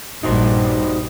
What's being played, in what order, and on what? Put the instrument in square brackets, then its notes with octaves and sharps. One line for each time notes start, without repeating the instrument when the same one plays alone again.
[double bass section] A#1 G2 G3 [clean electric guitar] D#4 F#4 C5